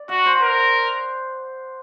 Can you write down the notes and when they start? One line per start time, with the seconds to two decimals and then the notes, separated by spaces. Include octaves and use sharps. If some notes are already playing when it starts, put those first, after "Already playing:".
Already playing: D5
0.09 F#4 F#5
0.26 C5
0.42 A#4